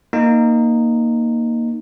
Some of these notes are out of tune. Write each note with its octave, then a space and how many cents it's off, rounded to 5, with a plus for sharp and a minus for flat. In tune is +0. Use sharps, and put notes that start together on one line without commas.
A#3 +0 D#4 -10